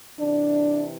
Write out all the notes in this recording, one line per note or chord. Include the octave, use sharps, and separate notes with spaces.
C3 E3 D4